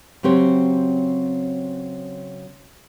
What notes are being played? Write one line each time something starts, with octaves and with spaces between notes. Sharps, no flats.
C#3 F#3 C4 G4 C#5